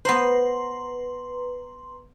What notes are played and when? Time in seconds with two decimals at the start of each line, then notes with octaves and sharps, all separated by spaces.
0.05 B3 B4 C5 A#5 C6